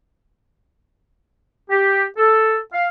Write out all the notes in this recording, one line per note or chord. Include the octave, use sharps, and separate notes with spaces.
G4
A4
F5